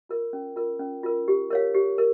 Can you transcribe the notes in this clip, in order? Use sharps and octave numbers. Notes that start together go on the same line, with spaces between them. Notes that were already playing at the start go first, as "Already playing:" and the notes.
F4 A#4
C#4
F4 A#4
C#4
F4 A#4
G4
A#4 C#5 F5
G4
A#4